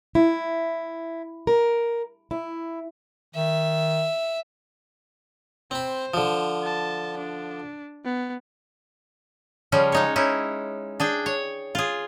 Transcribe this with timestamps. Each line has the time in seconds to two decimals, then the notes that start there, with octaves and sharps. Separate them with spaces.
0.15 E4
1.47 A#4
2.31 E4
3.35 D#3 E5
5.71 C4 C5 B5
6.14 D3 F3
6.64 A5
7.18 D4
8.05 B3
9.72 C#3 F3 G3 C#4
9.92 G#3 D#4 C#5
10.16 C#4 D#4 E4
11.00 D4 G#4 G5
11.26 C#5
11.75 F4 G#4